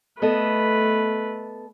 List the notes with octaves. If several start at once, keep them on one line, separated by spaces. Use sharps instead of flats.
A3 B3 A4 B4 D#5